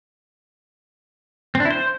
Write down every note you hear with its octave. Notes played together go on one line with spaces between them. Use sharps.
C4
D4
E4
C5